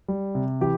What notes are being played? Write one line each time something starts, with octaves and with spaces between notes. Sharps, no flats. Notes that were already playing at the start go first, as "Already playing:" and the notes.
G3
C3
E3 G4